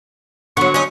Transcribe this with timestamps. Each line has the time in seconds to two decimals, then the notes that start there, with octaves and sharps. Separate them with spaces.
0.57 D3 F#3 B3 C#6
0.74 C#4 D#4